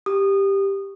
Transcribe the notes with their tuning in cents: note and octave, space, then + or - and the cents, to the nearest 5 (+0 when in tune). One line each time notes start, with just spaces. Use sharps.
G4 +5 D#6 -25